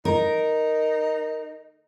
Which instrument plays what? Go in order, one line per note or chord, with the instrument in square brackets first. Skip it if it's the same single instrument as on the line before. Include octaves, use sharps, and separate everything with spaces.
[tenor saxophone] D#4 [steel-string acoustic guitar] A#4